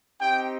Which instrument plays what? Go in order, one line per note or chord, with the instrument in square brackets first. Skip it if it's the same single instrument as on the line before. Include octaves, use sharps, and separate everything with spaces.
[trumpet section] C4 D#4 G4 G5